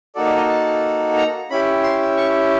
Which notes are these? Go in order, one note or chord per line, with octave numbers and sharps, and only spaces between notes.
A#3 D#4 F#4 A4 D5
D5
D#5
A5
A#5
C#4 E4 G4 B5
C6
C#6